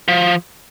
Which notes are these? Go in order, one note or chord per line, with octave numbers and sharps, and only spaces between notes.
F3